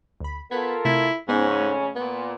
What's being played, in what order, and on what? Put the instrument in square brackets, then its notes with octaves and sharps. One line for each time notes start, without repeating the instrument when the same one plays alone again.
[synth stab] D2 B5
[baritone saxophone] B3 [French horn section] F4 A4 A#4 [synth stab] G#6 B6
[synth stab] C3 A3 G#6 [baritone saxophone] E4
[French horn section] F2 C#3 C#4 [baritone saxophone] G#2 [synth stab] B3 D#4 C5
[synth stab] A3
[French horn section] A#2 [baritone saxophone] B3